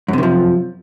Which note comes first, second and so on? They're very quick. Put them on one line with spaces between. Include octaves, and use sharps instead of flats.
F#2 C3 D#3 F3